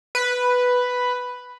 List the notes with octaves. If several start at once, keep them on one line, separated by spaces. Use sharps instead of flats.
B4